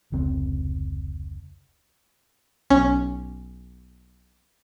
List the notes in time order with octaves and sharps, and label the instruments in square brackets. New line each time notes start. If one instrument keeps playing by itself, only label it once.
[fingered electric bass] F1 C#2 C4
[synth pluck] B1 C#4